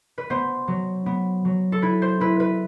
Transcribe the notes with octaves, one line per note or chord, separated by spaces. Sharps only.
B4
B3 C5
F#3
B3
F#3
A4
E4 B4
C5
E4 B4
B4